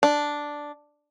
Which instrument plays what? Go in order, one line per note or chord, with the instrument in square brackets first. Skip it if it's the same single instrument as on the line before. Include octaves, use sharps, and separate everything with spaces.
[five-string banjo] D4